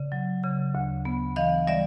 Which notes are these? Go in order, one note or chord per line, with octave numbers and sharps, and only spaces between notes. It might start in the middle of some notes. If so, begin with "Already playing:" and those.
Already playing: C#3 D5
F#3
C#3
D2
B3
E3 D#5 F5
G3 D5 E5